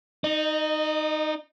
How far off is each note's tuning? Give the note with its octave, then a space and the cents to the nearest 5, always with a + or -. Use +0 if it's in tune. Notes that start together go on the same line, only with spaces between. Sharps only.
D#4 +0 D#5 -35